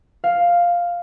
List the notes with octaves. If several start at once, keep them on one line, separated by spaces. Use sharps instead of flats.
F5